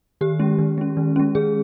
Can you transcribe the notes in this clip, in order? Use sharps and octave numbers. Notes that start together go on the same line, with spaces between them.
D#3 G4
G#3 C#4
D#3
G#3 C#4
D#3
G#3 C#4
D#3 G#4